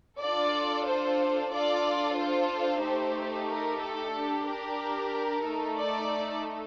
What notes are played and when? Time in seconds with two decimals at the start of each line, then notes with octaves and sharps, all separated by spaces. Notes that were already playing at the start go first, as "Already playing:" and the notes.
0.21 D4 F4 A4 D5
0.87 C5
1.52 D4 F4 A4 D5
2.18 C5
2.82 A3 D#4 G4
3.48 A#4
3.81 A4
4.13 D4 G4
4.47 A#4
5.44 A3 D#4 A4
5.77 D5